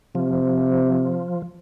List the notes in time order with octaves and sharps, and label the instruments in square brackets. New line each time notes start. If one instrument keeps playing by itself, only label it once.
[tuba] C3 [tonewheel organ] F3